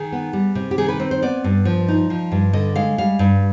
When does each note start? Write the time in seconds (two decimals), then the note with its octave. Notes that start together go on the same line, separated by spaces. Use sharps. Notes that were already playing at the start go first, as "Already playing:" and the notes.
Already playing: D#3 G#4
0.12 B3
0.33 G3
0.55 C3
0.71 G4
0.78 D#3 G#4
0.88 B4
1.00 C4
1.11 C5
1.22 B3 D5
1.44 G2
1.65 F3
1.88 D#4
2.10 F3
2.32 G2
2.53 D3 D#5
2.76 G#3 F5
2.98 G3 F5
3.19 G2